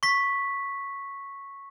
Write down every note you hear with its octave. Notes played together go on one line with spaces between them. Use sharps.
C#6 B6